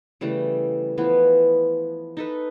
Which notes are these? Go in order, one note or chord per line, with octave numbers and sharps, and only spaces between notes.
C#3 E3 G3 A3
E3 F3 B3
D#4 A4 B4